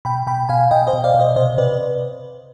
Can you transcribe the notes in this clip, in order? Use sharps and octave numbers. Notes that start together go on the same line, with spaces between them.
B2 G5 B5
B2 G5 B5
B2 F5 G#5
B2 D#5 G5
C5 D#5
B2
D5 F5
B2
C5 D#5
C3 C5 D#5
C3 B4 D5